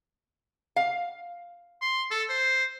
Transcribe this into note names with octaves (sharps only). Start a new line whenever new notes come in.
F5
C6
A4
C5